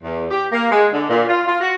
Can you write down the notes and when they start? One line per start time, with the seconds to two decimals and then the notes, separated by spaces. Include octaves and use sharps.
0.03 E2
0.30 G4
0.51 A#3
0.71 G#3
0.93 D3
1.08 A#2
1.28 F4
1.47 F4
1.61 F#4